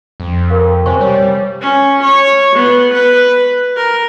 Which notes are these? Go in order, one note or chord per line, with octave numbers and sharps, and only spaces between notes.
F2
A#4 F5
C3 C5 G#5 C#6
G3 C#5
C#4
C#5
B3
B4
A#4